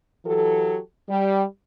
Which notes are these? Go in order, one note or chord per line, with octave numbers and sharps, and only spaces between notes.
E3 F#3 G4 A4
G3